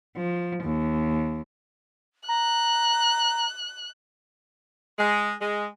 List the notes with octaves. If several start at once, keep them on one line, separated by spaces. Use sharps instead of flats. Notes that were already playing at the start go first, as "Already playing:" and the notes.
F3
D#2
A#5 F#6
G#3
G#3